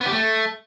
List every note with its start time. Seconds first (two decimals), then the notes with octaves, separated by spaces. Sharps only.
0.01 B3
0.06 G4
0.11 A3